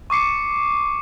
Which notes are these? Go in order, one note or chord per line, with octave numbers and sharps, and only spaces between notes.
C#6 D6 C7 C#7